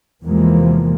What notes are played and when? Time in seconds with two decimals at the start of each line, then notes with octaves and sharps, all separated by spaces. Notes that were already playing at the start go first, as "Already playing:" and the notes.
0.24 E2 C3 E3 F3 G#3 A#3